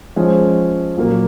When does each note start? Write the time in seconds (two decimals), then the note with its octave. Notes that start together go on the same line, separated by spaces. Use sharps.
0.16 F3 G#3 C#4
0.97 A#2 F#3 A#3